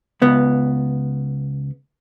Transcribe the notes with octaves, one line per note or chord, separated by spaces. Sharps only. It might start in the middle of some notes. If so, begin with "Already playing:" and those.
C#2 B3